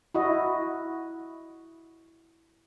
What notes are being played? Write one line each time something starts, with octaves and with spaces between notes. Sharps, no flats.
E4 F#4 D#5